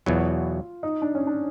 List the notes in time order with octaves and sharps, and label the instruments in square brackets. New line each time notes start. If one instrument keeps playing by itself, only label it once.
[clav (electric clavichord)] E2 B2 F#3 [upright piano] F4
[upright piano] D#4
D4
C#4
D4